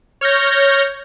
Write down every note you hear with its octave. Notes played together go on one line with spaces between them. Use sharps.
C#5 F6 G6 A#6